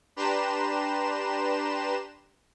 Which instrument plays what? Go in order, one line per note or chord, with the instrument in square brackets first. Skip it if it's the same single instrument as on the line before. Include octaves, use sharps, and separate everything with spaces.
[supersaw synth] D4 G4 B4 A#5 C6 E7